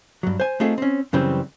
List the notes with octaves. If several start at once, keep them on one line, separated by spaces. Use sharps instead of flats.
G2 F#3
C5 G#5
A3 C4 D#4 F4 G#4 A4
C4 C#4
F#2 C#3 E3 G3 C4